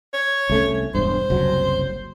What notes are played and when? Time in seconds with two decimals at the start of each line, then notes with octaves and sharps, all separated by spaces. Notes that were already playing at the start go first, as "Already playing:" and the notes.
0.14 C#5
0.49 C2 A3 C#4
0.95 E1 G2 C5
1.30 F#1 C2 F#3